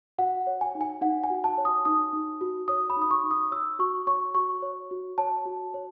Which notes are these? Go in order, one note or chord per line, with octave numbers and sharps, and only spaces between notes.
F#4 F#5
C#5
G#5
D#4
G#5
D#4 F#5
G#5
F#4
A5
C#5
D#6
D#4 D#6
D#4
F#4
C#5 D#6
B5
D#4
D#6
C#6
D#4
D#6
C#5 E6
F#4 C#6
C#5 C#6
F#4 C#6
C#5
F#4
C#5 A5
F#4
C#5